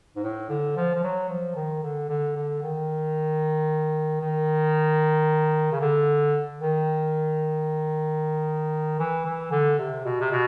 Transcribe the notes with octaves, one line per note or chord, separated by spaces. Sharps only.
G#2
A2
D3
F3
F3
F#3
F3
D#3
D3
D3
D3
D#3
D#3
C#3
D3
D#3
E3
E3
D3
C3
B2
C3
B2